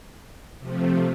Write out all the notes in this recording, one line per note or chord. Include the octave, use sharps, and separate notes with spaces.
C3 F3 A3